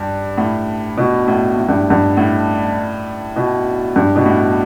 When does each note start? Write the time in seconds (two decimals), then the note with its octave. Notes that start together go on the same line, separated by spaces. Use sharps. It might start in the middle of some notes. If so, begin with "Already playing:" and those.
Already playing: G2
0.37 A2
0.97 B2
1.28 A2
1.57 A2
1.69 G2
1.90 G2
2.17 A2
3.36 B2
3.96 G2
4.16 B2
4.26 A2